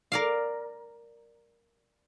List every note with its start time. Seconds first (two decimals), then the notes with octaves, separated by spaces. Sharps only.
0.12 A#4 D5 F5